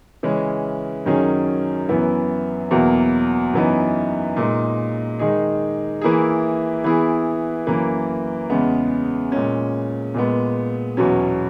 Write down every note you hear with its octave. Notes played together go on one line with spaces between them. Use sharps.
C#3 E3 G#3 C#4
F#2 D#3 F#3 C#4 G#4
F#2 E3 B3 E4
E2 B2 F#3 A#3
F#2 E3 B3 D#4
A#2 G#3 D#4
D#3 G#3 D#4 G#4
E3 A#3 E4 G#4
E3 B3 E4 G#4
F#2 E3 A#3
E2 C#3 G#3 B3
A#2 G#3 C#4
A#2 G#3 B3
E2 B2 F#3 C#4